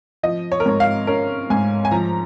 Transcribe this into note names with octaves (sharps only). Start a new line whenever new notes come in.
F3 D#5
C#5
A#4
G#2 C#5
F5
C#4 A#4
G#2 G#5
G#5
F3 A#5